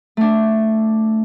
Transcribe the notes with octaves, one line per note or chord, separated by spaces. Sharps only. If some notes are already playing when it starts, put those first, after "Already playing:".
A3 D4